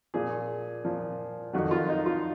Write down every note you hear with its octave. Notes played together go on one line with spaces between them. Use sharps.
A#2 F3 G#4
A#2 F3
F2 D#3 F#3 F#4
F4
D#4
F4